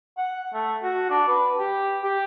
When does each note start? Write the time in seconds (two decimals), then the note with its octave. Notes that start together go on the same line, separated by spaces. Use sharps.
0.18 F#5
0.54 A3
0.83 F#4
1.10 D4
1.28 B4
1.58 G4
2.03 G4